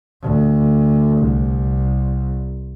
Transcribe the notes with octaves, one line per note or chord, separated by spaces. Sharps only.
D2
C2